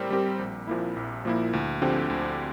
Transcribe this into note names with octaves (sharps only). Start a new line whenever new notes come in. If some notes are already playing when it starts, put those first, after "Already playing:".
Already playing: A2 G3 C4 G4 A#4
G3 C4 G4 A#4
A#1
A#2 F3 A#3 E4
A#1
A#2 F3 A#3 E4
D2
D3 F3 C4 G4
D2